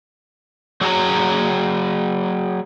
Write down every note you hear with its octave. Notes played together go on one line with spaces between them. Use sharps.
F#3 F#4 G#4 C#5 G#5 A#5